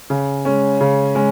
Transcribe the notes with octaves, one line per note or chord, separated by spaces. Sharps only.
C#3
G#3 C#4
C#3
G#3 C#4